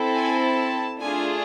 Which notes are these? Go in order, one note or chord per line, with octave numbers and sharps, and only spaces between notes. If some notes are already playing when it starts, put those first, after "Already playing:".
Already playing: C4 E4 A4
G#5
A5
A3 D4 F4 G#4 G#5